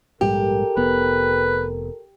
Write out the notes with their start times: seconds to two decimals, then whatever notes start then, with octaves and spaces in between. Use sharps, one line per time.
0.21 A#1 G#2 G3 G4 A4 A#4
0.77 F1 B3 B4